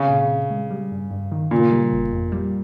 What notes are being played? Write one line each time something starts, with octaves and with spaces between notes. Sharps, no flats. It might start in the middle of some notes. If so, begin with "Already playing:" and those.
Already playing: C#3 C4
A#2
A#2
G#3
G3
G2
G2
D#3
A#2 C#3
G3
G1
F2
G3